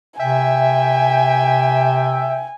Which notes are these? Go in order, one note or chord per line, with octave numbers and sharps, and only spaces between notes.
C3 E5 G5 G#5